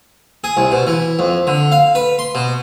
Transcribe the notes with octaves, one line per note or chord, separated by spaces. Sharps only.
G#4
C2
B2
E3
F2
D3
F5
B4
C6
B2